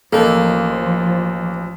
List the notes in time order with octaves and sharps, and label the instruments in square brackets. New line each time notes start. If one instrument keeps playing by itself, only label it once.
[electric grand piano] A1 [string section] F3 [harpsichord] A#3 D#4 [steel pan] A4